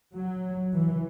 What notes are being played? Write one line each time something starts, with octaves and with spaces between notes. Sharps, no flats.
F#3
E3